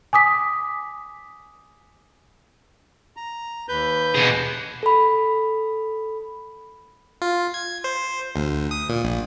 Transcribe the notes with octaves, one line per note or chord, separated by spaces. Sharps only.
G#5 D6 D#6 B6
A#5
D#2 B4 G6
B2 G#4
A4 B5
F4
G#6
C5
D2
D#6
A#2
A#1